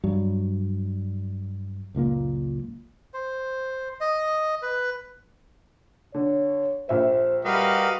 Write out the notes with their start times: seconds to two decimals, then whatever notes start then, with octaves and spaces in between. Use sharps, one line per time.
0.04 G2 F#3
1.95 F#1 C#2 A#2 A#3
3.14 C5
4.01 D#5
4.62 B4
6.14 D3 C#5
6.89 A#1 C5 E5
7.45 G3 F#4 G4 A#4 B4 D#5 F5